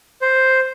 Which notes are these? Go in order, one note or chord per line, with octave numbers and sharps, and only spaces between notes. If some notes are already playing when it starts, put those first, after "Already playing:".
C5